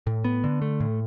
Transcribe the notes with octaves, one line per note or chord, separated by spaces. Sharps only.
A2
B3
D3
A3
A2